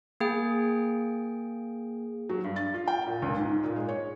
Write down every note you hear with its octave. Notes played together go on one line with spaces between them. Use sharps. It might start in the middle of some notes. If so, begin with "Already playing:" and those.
A#3 G#4 G5
F#3
G2
A6
F4
G5
A#2
C#2
G#2
A#2
G#3
C#5